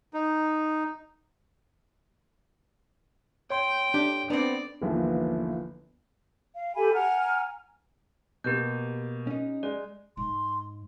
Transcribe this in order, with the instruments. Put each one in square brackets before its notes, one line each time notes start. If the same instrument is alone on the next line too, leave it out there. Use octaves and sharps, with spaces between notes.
[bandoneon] D#4
[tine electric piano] C#5 C6 [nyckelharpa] G5
[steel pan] D4 [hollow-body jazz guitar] G4
[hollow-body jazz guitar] B3 C4 [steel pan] D4 [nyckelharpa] D5
[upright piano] G1 D#2 E3 F3
[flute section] F5
G4 A4 G#5 B5
F#5 G#5 A#5 F6
[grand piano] B2 A#3 [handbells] G4 G6
[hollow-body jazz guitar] C#4 D#4
[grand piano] G#3 [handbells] D5
[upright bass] G#2 [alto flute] C6